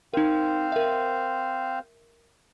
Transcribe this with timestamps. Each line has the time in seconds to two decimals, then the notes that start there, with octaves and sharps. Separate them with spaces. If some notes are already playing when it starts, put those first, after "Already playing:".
0.14 C4 D#4 A#4 C5 F5
0.72 A#4 E5